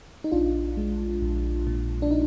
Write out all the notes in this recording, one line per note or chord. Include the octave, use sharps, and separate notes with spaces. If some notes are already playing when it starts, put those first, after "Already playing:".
D#4
A#1 D4 F4
G#3
A#1
A#2
D4
D#4